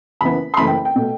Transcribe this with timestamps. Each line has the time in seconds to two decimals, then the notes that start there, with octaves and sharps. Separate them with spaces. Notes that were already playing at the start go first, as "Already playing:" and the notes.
0.21 F#1 F#2 E3 B3 B5
0.54 C6
0.57 F#1 F#2 E3 A3 B5
0.67 G5
0.85 G5
0.96 B2 A3